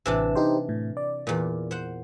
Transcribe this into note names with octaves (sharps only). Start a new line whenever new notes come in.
A1 C3 E3 D4 E6
D#4 G4 C5
A2
D5
E2 A#2
C5 F#5